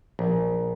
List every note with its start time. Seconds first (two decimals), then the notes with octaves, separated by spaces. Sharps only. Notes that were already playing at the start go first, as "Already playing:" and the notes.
0.19 A#1